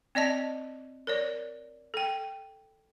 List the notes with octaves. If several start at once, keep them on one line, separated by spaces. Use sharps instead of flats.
C4 D5 D#5 A5
A#4 C#5 D5
A4 G5